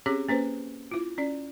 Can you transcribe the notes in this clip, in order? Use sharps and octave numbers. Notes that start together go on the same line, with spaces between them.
C4 C#4 G4 G#4 C#5 D6
A#3 C#4 B4 C5
E4 F4
C#4 D5